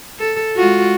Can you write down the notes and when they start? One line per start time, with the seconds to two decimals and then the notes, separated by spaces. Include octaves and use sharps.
0.20 A4
0.56 G#3 F4 F#4